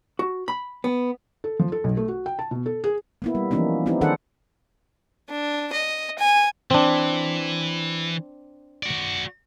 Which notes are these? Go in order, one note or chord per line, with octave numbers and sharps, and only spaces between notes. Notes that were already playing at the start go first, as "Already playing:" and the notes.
F#4
B5
B3
A4
F3
A4
B1
A3
F#4
G5
A5
B2
A4
G#4
A#3 B3 E4
G3
E3 F3 A#3 B3 C#4 D#4
B3 C4 D#4 E4 G4
D#3 D4 G#4 A4 C5 F#5
D4
D#5
G#5
E3 C4 D4
F#4 D5